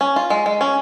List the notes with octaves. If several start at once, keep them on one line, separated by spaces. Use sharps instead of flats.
C#4
F4
G#3
G#3
C#4